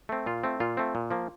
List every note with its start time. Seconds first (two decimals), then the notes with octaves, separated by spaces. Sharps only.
0.09 A3 C4
0.26 A#2 F4
0.44 A3 C4
0.60 A#2 F4
0.77 A3 C4
0.95 A#2
1.11 F3 A#3